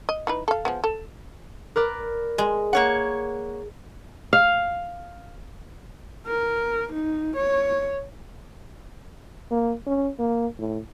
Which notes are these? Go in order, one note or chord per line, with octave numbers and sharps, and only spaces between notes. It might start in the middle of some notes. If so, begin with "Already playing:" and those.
D#5
E3 D#4 B4
A4 F5
F3 G#3 B3
A4
A#4 B4 D5
G#3
A#3 C#5 F#5
F5
A#4
D#4
C#5
A#3
C#4
A#3
A2